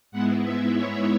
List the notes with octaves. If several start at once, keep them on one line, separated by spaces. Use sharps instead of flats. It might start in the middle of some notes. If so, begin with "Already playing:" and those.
G#2 G#3 B3 E4 F#5
E5
C#5